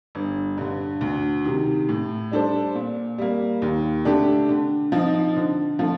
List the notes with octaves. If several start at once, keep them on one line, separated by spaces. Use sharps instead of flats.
G1
G2 D3
D2
C3 D#3
A2
G3 D4 A4 C5
A#2
G3 A#3
D#2
D3 A3 D4 G4
D3
F3 C4 D#4
D3
F3 A3